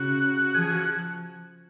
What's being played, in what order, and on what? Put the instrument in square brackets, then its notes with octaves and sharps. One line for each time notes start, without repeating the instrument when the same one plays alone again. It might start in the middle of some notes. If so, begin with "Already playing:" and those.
Already playing: [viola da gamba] C#3 [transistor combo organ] F#4
[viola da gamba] F3 [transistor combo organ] G#4
[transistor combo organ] F#4